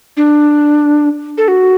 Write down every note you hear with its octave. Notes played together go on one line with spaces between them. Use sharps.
D4
A4
F#4